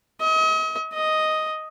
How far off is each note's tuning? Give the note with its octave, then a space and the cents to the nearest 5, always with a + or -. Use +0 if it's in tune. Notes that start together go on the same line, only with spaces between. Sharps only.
D#5 +40
D#5 +5